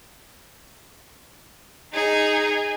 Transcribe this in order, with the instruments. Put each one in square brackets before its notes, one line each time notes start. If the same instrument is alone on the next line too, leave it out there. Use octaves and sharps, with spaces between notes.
[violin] D#4 G#4